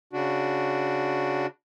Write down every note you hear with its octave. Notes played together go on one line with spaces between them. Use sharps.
C#3 D4 F#4